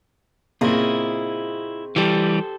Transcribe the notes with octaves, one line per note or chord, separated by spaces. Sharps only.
A#2 C#3 A#3 C4 E4 F4 G#4 D#5
E3 G3 G4 A4 C5